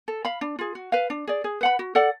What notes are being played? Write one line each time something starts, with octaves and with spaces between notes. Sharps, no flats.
A4
F5 B5
D4
F4 G#4
F#4
B4 F5
D4
G#4 D5
G#4
B4 F#5 B5
F#4
A4 D5 F#5